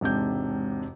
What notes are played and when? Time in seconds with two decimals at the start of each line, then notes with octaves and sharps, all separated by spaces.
0.01 E1 G#2 C3 D4 G6